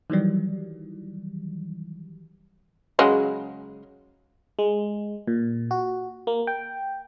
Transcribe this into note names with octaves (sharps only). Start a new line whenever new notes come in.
D#3 E3 F#3 G3
C#3 F#3 G#3
G#3
A#2
F#4
A#3
G5